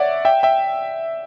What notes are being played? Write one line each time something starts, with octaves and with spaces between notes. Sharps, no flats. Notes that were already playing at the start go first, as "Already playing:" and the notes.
Already playing: C#5 D5 E5 F#5
E5 G5
E5 G5